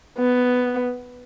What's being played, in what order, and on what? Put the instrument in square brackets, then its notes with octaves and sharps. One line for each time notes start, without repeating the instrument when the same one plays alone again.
[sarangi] B3